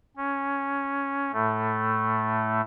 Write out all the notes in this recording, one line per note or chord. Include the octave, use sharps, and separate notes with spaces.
C#4
A2 A3